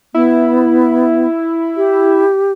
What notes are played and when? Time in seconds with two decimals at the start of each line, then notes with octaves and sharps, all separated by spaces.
0.14 B3 E4
1.77 G4